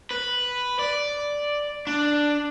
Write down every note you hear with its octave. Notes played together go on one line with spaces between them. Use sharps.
B4
D5
D4